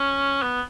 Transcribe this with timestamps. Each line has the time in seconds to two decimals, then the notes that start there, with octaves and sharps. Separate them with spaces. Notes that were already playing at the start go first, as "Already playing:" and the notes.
Already playing: C#4
0.42 B3